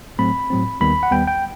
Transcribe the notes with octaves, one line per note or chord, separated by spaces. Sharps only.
A2 F#3 A3 C4 B5
A2 F#3 A3 C4
D#2 D#3 G3 B3 B5
F#5
D#2 D#3 G3 B3 G5
G5